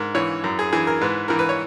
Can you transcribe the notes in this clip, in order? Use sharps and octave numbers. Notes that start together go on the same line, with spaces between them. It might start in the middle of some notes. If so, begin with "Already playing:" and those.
Already playing: G#2 A#4
E3 C#5
F#2
G#4
E3 G#4
A#4
G#2 B4
E3 A#4
B4
C#5